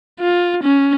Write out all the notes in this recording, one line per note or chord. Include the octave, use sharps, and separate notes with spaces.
F4
C#4